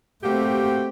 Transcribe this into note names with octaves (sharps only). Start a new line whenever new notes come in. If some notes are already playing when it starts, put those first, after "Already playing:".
A3 A#3 C4 F#4 G4